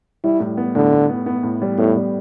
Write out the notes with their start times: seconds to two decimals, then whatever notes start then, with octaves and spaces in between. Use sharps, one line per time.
0.24 G3 E4
0.40 A2
0.57 B3
0.75 A2 D3
0.92 A2
1.09 B3
1.26 B3
1.43 A2
1.62 G3
1.78 A2 B3
1.96 G3